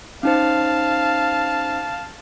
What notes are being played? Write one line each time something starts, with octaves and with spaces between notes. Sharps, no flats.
C#4 D#4 C5 F5 A5